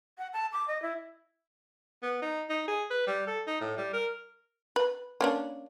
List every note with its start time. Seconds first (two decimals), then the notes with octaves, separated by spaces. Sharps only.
0.18 F#5
0.33 A5
0.52 D6
0.68 D#5
0.82 E4
2.03 B3
2.22 D#4
2.49 D#4
2.68 G#4
2.90 B4
3.07 G3
3.27 A4
3.47 D#4
3.60 A2
3.77 G3
3.94 A#4
4.76 B4
5.21 A#3 C#4 D4